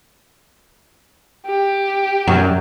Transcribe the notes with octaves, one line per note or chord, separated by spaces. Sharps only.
G4
F#2